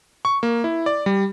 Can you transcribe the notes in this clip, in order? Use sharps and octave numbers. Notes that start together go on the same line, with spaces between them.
C#6
A#3
E4
D5
G3